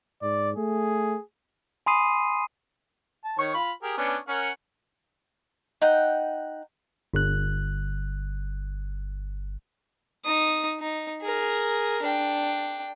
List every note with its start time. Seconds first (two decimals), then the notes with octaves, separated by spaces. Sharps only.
0.22 G#2 D5
0.57 A3 G#4
1.86 G#5 B5 C6 D#6 C7 D#7
3.24 A5
3.39 D#3 C#5 C#6
3.54 F4 B5
3.83 G4 G#4 A#4
3.98 B3 C#4 D4
4.29 C#4 A#4 F#5
5.82 D#4 F#5 G5
7.14 G1 F#6
10.25 D#4 D#6
10.80 D#4
11.22 G#4 A#4
12.02 D4 G5